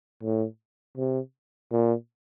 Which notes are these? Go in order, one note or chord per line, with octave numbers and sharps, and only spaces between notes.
A2
C3
A#2